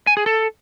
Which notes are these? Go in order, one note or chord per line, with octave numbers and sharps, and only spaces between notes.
G#5
G#4
A4